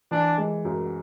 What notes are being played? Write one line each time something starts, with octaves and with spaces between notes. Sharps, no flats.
E3 D4
G#3
F#2